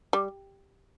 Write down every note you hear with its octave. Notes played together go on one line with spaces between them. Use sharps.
G3